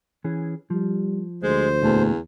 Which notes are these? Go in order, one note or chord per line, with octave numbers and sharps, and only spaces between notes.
E3 C#4 G#4
F3 G3
D2 G#3 C5
E2 A#2 A3 A5